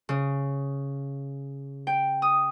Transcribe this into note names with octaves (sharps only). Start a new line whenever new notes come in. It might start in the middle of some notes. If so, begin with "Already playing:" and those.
C#3
G5
D#6